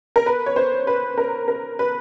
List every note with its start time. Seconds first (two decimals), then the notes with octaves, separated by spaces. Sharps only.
0.16 A#4
0.26 B4
0.46 C#5
0.56 C5
0.87 B4
1.18 A#4
1.48 A#4
1.79 B4